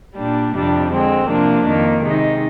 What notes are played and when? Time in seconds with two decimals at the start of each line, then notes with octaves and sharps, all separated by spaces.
0.16 A#2 G3 D4
0.54 F2 C3 G3 D4
0.92 D3 G#3 C4
1.28 C3 F3 A#3 D4
1.65 F2 D#3 A#3
2.03 C3 D#3 G#3 D#4